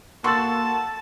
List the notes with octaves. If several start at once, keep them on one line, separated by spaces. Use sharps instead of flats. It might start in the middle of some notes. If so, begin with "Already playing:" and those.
A#3 F#4 A4 A5 C6 C#6 E6 A6